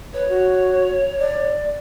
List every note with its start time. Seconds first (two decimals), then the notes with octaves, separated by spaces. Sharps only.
0.13 B4 C#5
0.28 F#4
1.19 D5